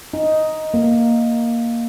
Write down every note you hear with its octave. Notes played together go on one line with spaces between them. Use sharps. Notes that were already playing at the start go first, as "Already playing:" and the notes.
D#4
A#3